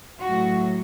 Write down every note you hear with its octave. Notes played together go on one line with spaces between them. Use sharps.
A2 F#3 F#4